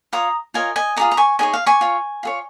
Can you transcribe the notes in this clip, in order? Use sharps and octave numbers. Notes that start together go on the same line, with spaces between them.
F4 C#5 A#5 D#6
F4 A#4 C#5 D#5 G#5
D#5 G#5
F4 G#4 D#5 A#5 D#6
A#5
G#5 C#6
D#4 G#4 C#5 D#5 G#5
F5
G#5 C#6
F4 C#5
F4 G#4 C#5